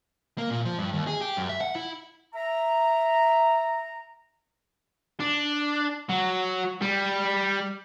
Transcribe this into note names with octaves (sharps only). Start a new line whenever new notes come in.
A#3
A#2
F3
G2
D#2
G#4
G4
F#2
E5
F#5
E4
E5 A#5
D4
F#3
G3